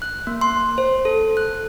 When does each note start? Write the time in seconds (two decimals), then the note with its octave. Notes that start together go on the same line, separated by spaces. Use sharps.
0.02 F#6
0.27 A#3
0.41 C6
0.78 C5
1.05 A4
1.37 F#6